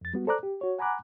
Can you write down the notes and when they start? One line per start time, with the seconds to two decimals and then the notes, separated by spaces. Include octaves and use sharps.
0.01 F2 A6
0.14 G3 B3 F#4
0.27 A4 C5 D5 A#5 D6 F#6
0.43 G4
0.61 F#4 C#5
0.79 F#5 G#5 A#5 B5 D6 F#6